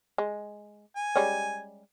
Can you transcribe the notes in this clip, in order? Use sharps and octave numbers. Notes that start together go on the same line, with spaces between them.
G#3
G#5
G3 G#3 C#4